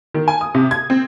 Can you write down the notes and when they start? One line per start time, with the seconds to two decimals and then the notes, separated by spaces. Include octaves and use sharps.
0.14 D#3
0.28 G#5
0.41 D#6
0.55 C3
0.71 G#6
0.90 C4